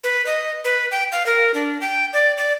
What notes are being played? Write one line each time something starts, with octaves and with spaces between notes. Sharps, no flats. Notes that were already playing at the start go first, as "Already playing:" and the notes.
B4
D#5
B4
G5
F5
A#4
D4
G5
D5
D5